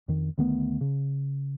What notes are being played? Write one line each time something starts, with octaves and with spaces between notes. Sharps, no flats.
F2 D#3
D2 D#3 A3 B3
C#3